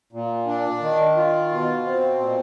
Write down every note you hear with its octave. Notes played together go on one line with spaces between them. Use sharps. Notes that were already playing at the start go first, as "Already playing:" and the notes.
A#2
D4
D#3
F4
B2
C4
A#2